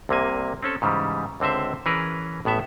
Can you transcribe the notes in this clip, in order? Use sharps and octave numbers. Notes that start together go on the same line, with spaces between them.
C2 C3 A#3 G#5
C4 C#4 A4
G#2 C#3 E3 G3
C#2 D3 C4 C5 E5
E3 C#4 G#4 A#4 B4
A1 A2 B3 E5